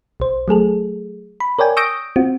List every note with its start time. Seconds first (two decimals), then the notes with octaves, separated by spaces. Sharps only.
0.20 B1 C5
0.48 F#3 A3 G#4 A4
1.40 B5
1.59 A#4 C#5 D5 G5 G#5
1.77 C#6 D#6 E6 G6 A#6 D7
2.16 C4 F4 F#4